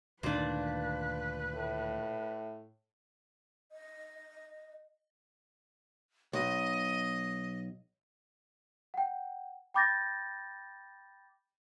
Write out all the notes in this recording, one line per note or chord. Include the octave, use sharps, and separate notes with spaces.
D2 G2 A#2 D#3 D4 B4
A2
D#5
B1 D#5
F#5 G5
G5 B5 D6 G6 A6 A#6